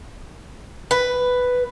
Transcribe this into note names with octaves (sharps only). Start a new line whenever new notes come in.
B4